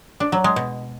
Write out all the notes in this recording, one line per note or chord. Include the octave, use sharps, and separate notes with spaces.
D4
F#3
G#3
B2